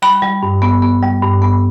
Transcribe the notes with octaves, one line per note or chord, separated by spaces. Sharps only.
G3 B5
G3
G2
B3
B3
G3
G2
B3